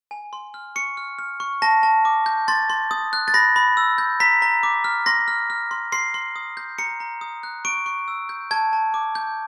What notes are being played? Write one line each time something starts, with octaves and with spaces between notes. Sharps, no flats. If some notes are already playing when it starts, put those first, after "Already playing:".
G#5
C6
F6
C#6 C#7
F6
F6
C#6
A5 A#6
A5
D6
G6
C6 A6
C6
D#6
F#6
A6
B5 A#6
B5
E6
G6
A#5 B6
A#5
D6
F6
C6 A#6
F6
F6
C6
C6 C7
C6
D#6
G6
A#5 C#7
A#5
D#6
F#6
C#6 D7
C#6
E6
G6
A5 G#6
A5
D6
G6